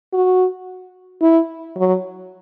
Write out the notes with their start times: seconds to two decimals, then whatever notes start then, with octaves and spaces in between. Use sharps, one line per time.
0.13 F#4
1.22 E4
1.77 F#3